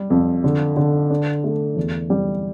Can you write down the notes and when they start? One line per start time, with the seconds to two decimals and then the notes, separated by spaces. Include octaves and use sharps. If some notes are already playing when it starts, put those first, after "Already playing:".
Already playing: G3
0.10 F2
0.44 D3
0.77 D3
1.10 D4
1.44 A3
1.76 E2
2.10 G3